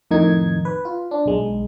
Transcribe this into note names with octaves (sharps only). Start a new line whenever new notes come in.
F2 A2 D#3 D#4 G#6
B4
F4
D4
B1 G#3